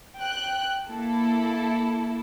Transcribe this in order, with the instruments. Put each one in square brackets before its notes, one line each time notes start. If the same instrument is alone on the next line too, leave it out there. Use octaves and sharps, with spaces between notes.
[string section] G5 F#6
A#3 E4 A4